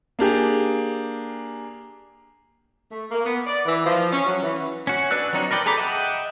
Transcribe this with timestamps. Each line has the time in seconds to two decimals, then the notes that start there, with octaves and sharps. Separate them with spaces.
0.19 A#3 D4 G4 G#4
2.91 A3
3.11 A#3
3.25 B3
3.46 D5
3.66 E3
3.86 F3
4.11 C#4
4.26 F#3
4.42 E3
4.87 C#4 F#4
5.11 D4 B4 D5 E6 F#6
5.33 F#3 C4 D4 D#4 F#4
5.51 A#4 B4 D5 G5
5.66 G#4 A4 A#5 B5 D6
5.77 D#5 E5 F#5 G5